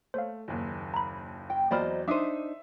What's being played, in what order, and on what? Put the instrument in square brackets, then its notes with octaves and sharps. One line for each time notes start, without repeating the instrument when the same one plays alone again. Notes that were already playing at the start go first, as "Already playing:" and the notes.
[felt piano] A3 [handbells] C5 C#5 F5
[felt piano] F#1 D#2
[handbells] A#5 B5
[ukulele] G5
[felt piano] E2 F#3 [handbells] A#3 B5 F6 [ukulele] C5 D5 D#5
[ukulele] D4 D#4 C5 [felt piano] E5 D#7 [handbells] D6 D#6